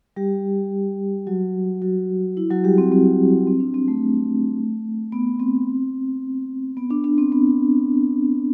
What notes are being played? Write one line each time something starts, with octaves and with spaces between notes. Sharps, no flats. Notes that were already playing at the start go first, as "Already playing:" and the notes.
G3 G4
F#3 F#4
F#3 F#4
E4
F#3 F#4
G3 G4
C4
C4
C4
D4
C4
A3
B3
C4
B3
D4
D4
C4
B3